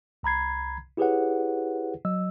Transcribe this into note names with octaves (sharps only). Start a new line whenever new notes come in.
C2 A#5 B5 G#6 C7
E4 G4 G#4 B4 C#5 F#5
F#3 D#5 E6